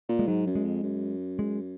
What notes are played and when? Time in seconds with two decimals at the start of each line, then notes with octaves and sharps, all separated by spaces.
0.09 A#2
0.19 G#3
0.27 G#2 F#3
0.46 F#2
0.55 G#3
0.64 F2
0.83 F#2
1.39 G#3